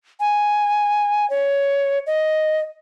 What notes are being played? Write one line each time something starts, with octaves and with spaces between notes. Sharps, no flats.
G#5
C#5
D#5